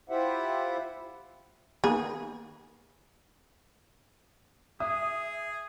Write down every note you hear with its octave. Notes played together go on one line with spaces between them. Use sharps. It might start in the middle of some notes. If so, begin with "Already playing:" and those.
E4 F4 G4 C5 E5 F#5
D#3 A#3 B3 G#4
G#4 E5 D#6